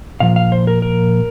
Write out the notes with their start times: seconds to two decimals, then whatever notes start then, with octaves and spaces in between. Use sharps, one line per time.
0.20 A#2 F3 F5
0.36 F5
0.52 C5
0.67 A#4
0.82 A#4